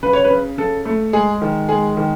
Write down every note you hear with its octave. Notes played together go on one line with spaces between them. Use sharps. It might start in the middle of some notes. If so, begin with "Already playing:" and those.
C#3 B4
C#5
B4
C#3
C#3 A4
A3
G#3 G#4
D#3
G#3 G#4
D#3